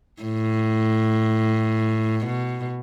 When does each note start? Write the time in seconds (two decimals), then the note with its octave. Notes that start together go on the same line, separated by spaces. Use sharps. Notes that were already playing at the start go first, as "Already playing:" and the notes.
0.22 A2
2.26 B2